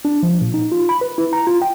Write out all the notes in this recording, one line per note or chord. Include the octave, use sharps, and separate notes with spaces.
D4
F3
A#2
D#4
F4
B5
B4
E4
A#5
F4
G5